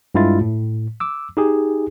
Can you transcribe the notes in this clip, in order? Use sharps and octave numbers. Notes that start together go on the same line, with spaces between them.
G2 G#3 E4 F4 A6
A2
D6 E6
D#4 G4 G#4